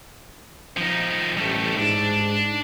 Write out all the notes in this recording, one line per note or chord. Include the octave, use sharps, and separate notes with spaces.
F3 D#4
A1 G3 A3
G#2 D4